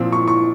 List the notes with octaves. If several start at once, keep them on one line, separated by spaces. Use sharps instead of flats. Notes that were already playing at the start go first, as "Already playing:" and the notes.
Already playing: A#2 F3 C4
C#6
C#6